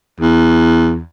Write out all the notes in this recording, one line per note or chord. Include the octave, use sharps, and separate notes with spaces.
E2